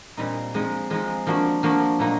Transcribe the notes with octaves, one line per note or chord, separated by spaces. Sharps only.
A#2 G3 C4 D#4
F3 G#3 C4 D#4
F3 G#3 C4 D#4
F3 A#3 D4 F#4
F3 A#3 D4 F#4
A#2 F#3 A#3 D#4